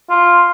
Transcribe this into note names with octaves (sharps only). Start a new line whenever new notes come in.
F4